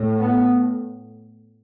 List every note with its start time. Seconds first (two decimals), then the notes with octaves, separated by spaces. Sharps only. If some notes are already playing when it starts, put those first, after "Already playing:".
Already playing: A2
0.19 B3